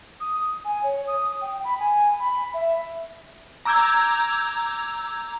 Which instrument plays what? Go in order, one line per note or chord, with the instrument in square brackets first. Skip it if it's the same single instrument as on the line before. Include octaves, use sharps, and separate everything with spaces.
[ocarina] D#6
G#5
C#5
D#6
G5
B5
G#5
B5
E5
[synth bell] A#5 D6 E6 G6 G#6